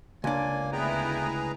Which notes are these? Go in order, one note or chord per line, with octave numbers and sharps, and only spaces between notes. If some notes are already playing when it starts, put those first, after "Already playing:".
C#2 A#3 D4 G#5
D2 B3 E4 G#4 B4 G5 A#5